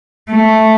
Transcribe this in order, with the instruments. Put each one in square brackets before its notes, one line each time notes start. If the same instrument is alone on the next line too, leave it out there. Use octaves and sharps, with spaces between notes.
[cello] A3